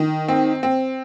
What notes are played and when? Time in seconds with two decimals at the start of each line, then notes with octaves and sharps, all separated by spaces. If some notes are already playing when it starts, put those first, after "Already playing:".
Already playing: D#3
0.28 C4
0.63 C4